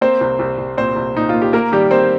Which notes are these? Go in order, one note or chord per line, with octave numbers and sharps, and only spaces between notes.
A#3 C4 C5
C2
C2
C2
A#2 C4 C5
C2
A#2 D#4
A#3 F4
G4
A#3 A#4
D#3 G3 G4
A#3 C4 C5